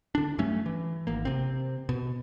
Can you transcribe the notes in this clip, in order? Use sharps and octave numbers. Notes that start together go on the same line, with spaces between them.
D3 D4
G2 F#3 A3 C#4
E3
G#1 A#3
C3 C4
B2